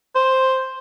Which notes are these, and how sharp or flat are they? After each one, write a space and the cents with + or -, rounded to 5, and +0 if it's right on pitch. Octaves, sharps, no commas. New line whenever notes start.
C5 +5